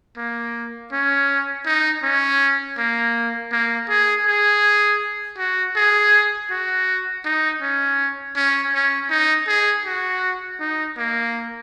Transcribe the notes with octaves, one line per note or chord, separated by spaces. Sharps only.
A#3
C#4
D#4
C#4
A#3
A#3
G#4
G#4
F#4
G#4
F#4
D#4
C#4
C#4
C#4
D#4
G#4
F#4
D#4
A#3